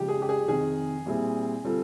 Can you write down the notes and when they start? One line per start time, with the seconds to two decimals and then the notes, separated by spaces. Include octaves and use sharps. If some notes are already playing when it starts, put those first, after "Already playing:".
Already playing: C#3 F3 G#3 G4
0.08 G#4
0.22 G4
0.29 G#4
0.48 F2 C3 D#3 G#4
1.06 A#2 G3 C4 E4 G#4
1.64 D3 G3 C4 F4 A4